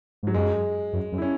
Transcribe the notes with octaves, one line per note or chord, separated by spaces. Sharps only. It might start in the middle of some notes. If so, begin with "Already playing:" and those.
G#2 F#3
F#2 G#3
F#2
F#2
E4
C#4